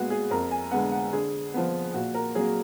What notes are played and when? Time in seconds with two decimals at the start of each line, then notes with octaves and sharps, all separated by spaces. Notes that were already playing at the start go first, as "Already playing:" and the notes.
Already playing: A#2 G#3 B3 F#4 G#4
0.10 G#4
0.31 F2 A#4
0.51 G#5
0.71 D3 G#3 B3 F#5
0.91 F#5
1.12 D3 G#4
1.54 F3 B3
1.94 A#2 F#4
2.14 A#4
2.35 F#3 A#3 G#4